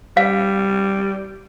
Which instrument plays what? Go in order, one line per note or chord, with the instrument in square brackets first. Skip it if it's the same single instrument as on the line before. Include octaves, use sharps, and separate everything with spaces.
[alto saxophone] G3 [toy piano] F5